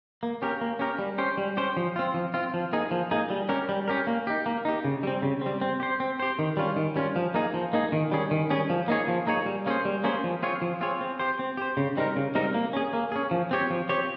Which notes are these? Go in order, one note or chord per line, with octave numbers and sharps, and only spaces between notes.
A#3
C#4 G4 A#4
A#3
C#4 G4 A#4
G3
C#4 G4 C5
G3
C#4 G4 C5
F3
C4 F4
F3
C4 F4
F3
A#3 D#4 G#4
F3
A#3 D#4 G#4
G3
C#4 G4 A#4
G3
C#4 G4 A#4
A#3
D#4 G4
A#3
D#4 G4
C#3
G3 C4
C#3
G3 C4
C4
G4 C5
C4
G4 C5
D#3
G3 C#4 F4
D#3
G3 C#4 F4
F3
A#3 D#4 G#4
F3
A#3 D#4 G#4
D#3
G3 C#4 G#4
D#3
G3 C#4 G#4
F3
A#3 D#4 G#4 C#5
F3
A#3 D#4 G#4 C#5
G3
A#3 C#4 G#4 C5
G3
A#3 C#4 G#4 C5
F3
C4 F4 G#4 C#5
F3
C4 F4 G#4 C#5
C4
G4 C5
C4
G4 C5
C#3
G3 C4 D#4 A#4
C#3
G3 C4 D#4 A#4
A#3
C#4 G#4
A#3
C#4 G#4
F3
C4 G4 C#5
F3
C4 G4 C#5